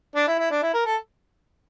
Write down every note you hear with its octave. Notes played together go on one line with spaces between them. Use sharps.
D4
E4
E4
D4
E4
A#4
A4